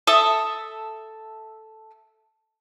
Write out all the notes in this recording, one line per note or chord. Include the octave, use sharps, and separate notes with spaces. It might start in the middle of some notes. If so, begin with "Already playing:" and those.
A4 E5 D#6